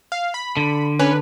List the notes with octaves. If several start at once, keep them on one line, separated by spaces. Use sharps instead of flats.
F5
B5
D3
C#4 B4